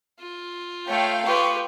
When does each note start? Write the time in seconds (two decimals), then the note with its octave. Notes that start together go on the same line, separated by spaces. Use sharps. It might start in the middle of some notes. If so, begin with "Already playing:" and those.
0.20 F4
0.87 A3 C#5 F5 G5
1.26 F4 G4 B4 C#6